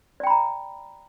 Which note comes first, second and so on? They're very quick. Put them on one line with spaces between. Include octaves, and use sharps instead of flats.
D5 G5 B5 A#5